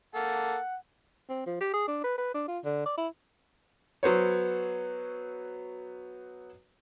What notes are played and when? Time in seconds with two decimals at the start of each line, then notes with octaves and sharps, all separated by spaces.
0.15 A#3 A4 F#5
1.29 C4
1.47 F3
1.60 G4
1.74 G#4
1.88 D4
2.04 B4
2.18 B4
2.35 D4
2.48 F4
2.64 D3
2.86 D5
2.98 E4
4.03 F#3 B3 C5 C#5